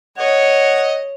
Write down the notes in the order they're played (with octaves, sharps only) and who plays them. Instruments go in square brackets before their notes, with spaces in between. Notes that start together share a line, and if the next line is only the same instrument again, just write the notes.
[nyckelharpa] C#5 [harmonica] D#5 F#5